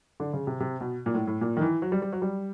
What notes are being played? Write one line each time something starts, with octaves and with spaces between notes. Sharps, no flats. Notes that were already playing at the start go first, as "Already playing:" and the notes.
D3
C#3
C3
C3
B2
A#2
A2
A2
A#2
D#3
E3
F#3
G3
G3
F#3
G3